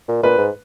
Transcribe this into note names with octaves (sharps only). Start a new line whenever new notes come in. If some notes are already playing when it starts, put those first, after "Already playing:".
A#2
A#2 B4
G#2